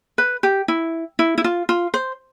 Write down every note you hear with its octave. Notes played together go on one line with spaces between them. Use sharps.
B4
G4
E4
E4
E4
F4
F4
C5